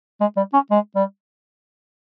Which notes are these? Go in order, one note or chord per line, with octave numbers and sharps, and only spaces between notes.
G#3
G3
C#4
G#3
G3